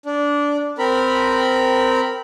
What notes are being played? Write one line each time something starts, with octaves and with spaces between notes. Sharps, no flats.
D4
C4 A#4 B5